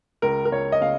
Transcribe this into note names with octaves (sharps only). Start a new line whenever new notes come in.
C#2 A#4
A#4
C#2 C#5
D#5
C#3 F5